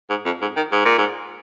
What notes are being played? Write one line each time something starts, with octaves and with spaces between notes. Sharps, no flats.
G#2
F2
G#2
D#3
G#2
A#2
G#2